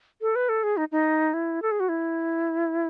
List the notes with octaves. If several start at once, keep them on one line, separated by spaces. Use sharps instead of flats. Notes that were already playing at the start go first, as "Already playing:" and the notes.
A4
B4
A4
G#4
D#4
D#4
E4
A4
G#4
F#4
E4